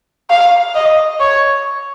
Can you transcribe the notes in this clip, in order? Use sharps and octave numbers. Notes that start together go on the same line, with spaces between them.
F5
D#5
C#5